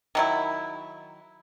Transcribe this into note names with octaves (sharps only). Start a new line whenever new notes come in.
D#3 F#3 E4